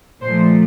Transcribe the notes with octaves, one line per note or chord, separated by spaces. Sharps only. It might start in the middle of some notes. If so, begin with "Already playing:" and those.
A#2 F3 A3 C5